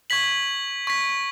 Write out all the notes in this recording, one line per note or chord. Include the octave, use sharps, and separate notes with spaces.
C#6 G#6 B6 F#7
C#6 G#6 B6